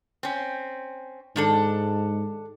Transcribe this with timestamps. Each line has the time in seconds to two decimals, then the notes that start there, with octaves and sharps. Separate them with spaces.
0.23 C4 C#4
1.36 G#2 D#3 D4 A4